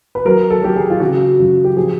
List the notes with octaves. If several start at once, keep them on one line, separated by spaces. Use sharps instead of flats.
B4
F#3 A#4
A4
F#3 G4
G#4
F4
C#3 F#4
F#2
G4
F3 G#4